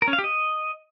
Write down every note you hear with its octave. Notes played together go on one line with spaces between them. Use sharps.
A#4
C#4
F5
G4
D#5